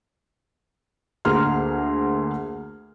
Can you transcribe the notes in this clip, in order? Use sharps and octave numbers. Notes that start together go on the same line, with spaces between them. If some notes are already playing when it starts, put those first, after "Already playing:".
D2 A#3 G#4 A#5 C6 F6